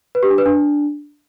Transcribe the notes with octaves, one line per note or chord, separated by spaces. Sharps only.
B4
G4
D4
B4
D4